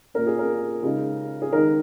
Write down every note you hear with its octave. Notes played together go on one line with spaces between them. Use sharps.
A#2 A#3 C#4 A#4
G#4
A#4
C#3 G#3 D#4
G#4
D#3 G#3 D#4 A#4